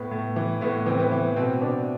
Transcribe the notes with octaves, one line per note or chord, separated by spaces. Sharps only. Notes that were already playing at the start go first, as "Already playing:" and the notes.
Already playing: A2 B3
A2
E3
A2 B3
E3 C4
B3
E3
B2 C4
B2 D4